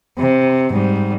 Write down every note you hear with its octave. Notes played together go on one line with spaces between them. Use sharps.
C3
G#2 G3